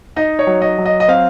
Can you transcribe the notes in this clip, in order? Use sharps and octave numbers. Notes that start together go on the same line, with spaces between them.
D#4 D#5
C#5
F#3
D#5
F#3
D#5
D#5
C4 F5